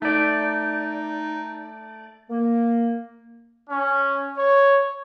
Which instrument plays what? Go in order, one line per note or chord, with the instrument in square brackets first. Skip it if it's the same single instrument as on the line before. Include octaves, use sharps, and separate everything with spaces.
[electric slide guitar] A3 D5 [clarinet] D#4
[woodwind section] A#3
[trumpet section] C#4
C#5